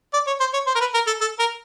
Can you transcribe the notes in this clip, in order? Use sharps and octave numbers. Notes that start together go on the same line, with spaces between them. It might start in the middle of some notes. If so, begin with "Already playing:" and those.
D5
C#5
C5
C#5
C5
A#4
B4
A#4
A4
A4
A#4